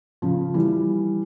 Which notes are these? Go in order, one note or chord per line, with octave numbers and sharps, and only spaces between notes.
C#3 F3
E3 G3